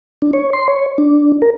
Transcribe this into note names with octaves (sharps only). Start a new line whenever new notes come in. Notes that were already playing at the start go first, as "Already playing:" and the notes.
D4
C#5
C6
C#5
D4
A#4